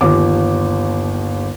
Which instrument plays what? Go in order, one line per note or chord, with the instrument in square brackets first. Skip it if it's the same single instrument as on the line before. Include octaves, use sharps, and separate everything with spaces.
[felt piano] G1 D#2 D6